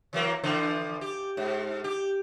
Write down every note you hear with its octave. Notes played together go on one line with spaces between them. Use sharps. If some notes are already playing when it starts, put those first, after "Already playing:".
E3 F#3 A#3
D3 E3 F3
G4
G#2
G4